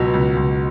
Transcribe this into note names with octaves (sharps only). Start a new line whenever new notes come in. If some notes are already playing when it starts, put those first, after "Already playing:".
Already playing: C#2 B2 F#3
C#2
C#2